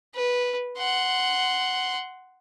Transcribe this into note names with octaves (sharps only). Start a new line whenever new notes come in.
B4
F#5 C6